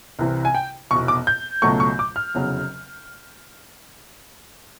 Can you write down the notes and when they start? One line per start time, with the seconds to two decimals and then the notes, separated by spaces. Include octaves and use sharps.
0.19 C2 C3 E3
0.45 G#5
0.55 G5
0.91 F1 E2 B2 C#6
1.08 D6
1.27 G6
1.62 C#2 B2 F#3 A3 C#6
1.80 C#6
1.99 D6
2.16 F6
2.34 F1 E2 C#3 F#3